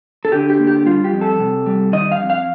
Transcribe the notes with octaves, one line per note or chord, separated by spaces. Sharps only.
A4
D3 G4
G4
A#3
G4
G3 F4
G4
F2
A4
C3
G3
D#3 D#5
F5
F2
F5